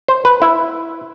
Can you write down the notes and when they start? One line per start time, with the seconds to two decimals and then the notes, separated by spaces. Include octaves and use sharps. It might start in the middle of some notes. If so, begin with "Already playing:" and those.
0.08 C5
0.25 B4
0.42 E4